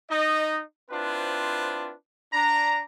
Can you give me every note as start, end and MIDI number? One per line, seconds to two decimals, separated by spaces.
0.11 0.61 63
0.11 0.61 75
0.91 1.94 60
0.91 1.94 62
0.91 1.94 64
0.91 1.94 65
0.91 1.94 71
0.91 1.94 72
2.33 2.84 62
2.33 2.84 82